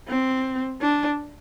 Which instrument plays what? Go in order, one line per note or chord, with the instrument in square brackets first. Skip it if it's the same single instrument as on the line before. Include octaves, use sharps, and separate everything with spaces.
[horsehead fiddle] C4
D4